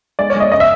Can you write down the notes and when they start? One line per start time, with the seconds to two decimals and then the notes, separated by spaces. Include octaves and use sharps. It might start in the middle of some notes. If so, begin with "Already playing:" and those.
0.19 G#3 D5
0.30 C#5
0.36 G#3 D#5
0.52 C#3 D#5
0.60 E5